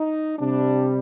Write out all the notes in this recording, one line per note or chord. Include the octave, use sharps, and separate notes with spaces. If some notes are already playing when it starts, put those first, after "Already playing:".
Already playing: D#4
C3 G3 D4